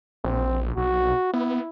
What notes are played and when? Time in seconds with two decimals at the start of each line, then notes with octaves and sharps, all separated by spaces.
0.24 A#1 C4
0.77 B1 F#4
1.33 B3 E4